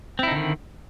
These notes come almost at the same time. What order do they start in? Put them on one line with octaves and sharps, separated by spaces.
C4 E4 D#4 D3 D#3